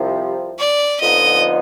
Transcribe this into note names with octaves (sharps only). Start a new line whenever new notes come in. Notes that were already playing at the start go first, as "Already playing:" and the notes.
Already playing: C2 C3 F3
D5
F2 D3 F3 B3 D#4 D#5